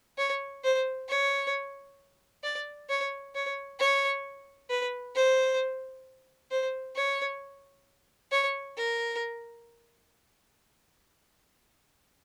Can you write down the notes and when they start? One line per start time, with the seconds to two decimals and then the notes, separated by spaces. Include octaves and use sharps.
0.17 C#5
0.64 C5
1.09 C#5
2.43 D5
2.89 C#5
3.35 C#5
3.80 C#5
4.70 B4
5.15 C5
6.51 C5
6.96 C#5
8.32 C#5
8.77 A#4